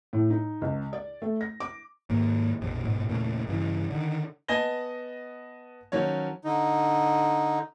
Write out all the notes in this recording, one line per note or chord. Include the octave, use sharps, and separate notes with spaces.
A2
D#4
C#2
D5
A3
A#6
D6
D#2 G#2 A#3
A#1 F2 B2
D1 G#2 B2
E2 A#2 C#3 A3
G2 C#3 E3
D3 D#3
B3 D#5 G#5 A5 A#6 G7
D#3 F3 F#3 C#4 C#5
D3 D#4